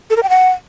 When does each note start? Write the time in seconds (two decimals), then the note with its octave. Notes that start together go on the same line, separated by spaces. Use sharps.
0.10 A4
0.17 A#4
0.23 G5
0.29 F#5